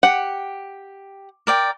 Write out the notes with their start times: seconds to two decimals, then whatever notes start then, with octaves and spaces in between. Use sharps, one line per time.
0.03 G4 F#5
1.47 A#4 D5 G5